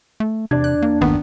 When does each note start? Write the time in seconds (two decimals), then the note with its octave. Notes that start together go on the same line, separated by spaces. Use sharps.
0.20 A3
0.51 E2 C3 D4 D5 G#6
0.64 F#6
0.82 A#3
1.01 A1 E2 G2 D#3 B3